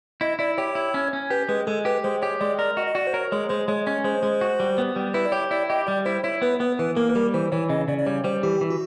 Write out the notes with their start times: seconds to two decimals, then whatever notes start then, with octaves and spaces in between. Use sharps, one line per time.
0.21 E4 D#5
0.39 E4 D5
0.58 G4 C#5
0.75 E4
0.94 C#4
1.13 C#4
1.30 G4 B4
1.49 G#3 B4
1.67 G#3 A4
1.85 G4 B4
2.04 G#3 C5
2.22 G4 C#5
2.41 G#3 D5
2.58 A#4 D5
2.77 F#4 D#5
2.87 D#5
2.95 F#4 D5
3.07 C5
3.14 A#4 C#5
3.32 G#3 C#5
3.49 G#3 C5
3.68 G#3 C#5
3.87 C#4 C#5
4.04 G#3 C5
4.23 G#3
4.41 F#4
4.60 G3
4.78 B3
4.96 G3
5.14 E4 B4
5.26 D5
5.32 G4 C#5
5.51 E4 D5
5.70 G4 D#5
5.87 G3 D5
6.05 E4 C5
6.24 E4 C#5
6.42 B3 B4
6.60 B3 B4
6.79 E3 B4
6.96 A#3 A#4
7.09 B4
7.15 G3 A#4
7.34 E3 C5
7.52 E3 C#5
7.69 C#3 D#5
7.88 C#3 D5
7.98 D5
8.06 G3 C#5
8.24 G3 C5
8.43 E3 G4
8.61 E3
8.70 F#4